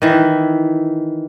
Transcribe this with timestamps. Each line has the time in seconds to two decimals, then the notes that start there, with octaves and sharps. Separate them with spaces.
0.02 D#3 E3 E4